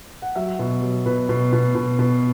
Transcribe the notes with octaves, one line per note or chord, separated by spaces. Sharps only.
F#5
F#3 E5
B2
F#3
B2 B4
B2
B2
B2
B2